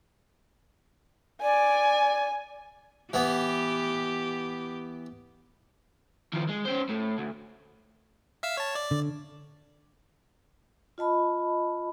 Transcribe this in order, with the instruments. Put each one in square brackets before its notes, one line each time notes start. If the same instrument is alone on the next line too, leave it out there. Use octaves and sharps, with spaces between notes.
[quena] D5 [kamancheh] G#5
[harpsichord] E3 B3 [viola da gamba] G4
[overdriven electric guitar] D#3 F3
G#3
C#4 C5
A2
D2
[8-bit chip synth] E5 F5 E6
C#5 A5
D5
[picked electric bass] D3
[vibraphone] F4 D#5 A5 B5